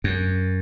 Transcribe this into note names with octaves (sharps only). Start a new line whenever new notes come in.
F#2